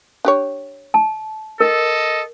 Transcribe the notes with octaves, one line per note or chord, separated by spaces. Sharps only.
D4 G4 C#5
A5
A4 A#4 D#5